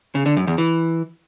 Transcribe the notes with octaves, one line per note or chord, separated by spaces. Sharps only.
C#3
D3
F#2
E2
E3